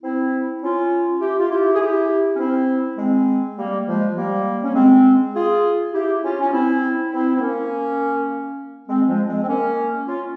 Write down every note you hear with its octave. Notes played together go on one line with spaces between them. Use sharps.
C4 E4
C#4 F4
E4 G4
F4
E4 G4
G#4
E4 G4
C#4
C4 E4
G#3 C4
G3 A#3
F3 G#3
G3 A#3
C#4
G#3 C4
F4 G#4
E4 G4
C#4 F4
C#4
C4 E4
C4 E4
C4
A#3 C#4
G#3 C4
F3 G#3
G#3 C4
C4
A#3 C#4
C#4 F4